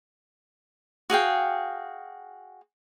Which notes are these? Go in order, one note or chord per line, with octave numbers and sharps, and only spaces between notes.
F#4 G#4 F5 G5